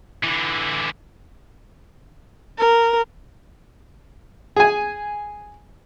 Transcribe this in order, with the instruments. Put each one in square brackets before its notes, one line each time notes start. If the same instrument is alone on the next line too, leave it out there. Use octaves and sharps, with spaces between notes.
[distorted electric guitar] D3 E3
[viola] A#4
[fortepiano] G#4 G#5